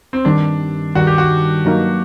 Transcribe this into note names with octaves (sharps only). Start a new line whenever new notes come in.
C4
G2 D#3 G3 D4
G2 D#3 G3 F#4
G4
F#4
G2 F#3 A#3 D#4